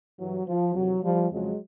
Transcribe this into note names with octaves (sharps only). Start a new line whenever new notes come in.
G2 E3 F#3
F3
F2 C3 E3 F#3
F3 G3
F2 C#3 F3 F#3 G#3